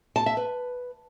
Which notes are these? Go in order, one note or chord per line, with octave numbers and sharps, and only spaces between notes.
A5
E5
B4